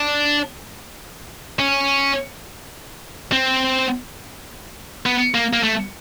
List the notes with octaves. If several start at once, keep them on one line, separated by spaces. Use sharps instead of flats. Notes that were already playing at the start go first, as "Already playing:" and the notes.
Already playing: D4
C#4
C4
B3
A#3
A#3
A3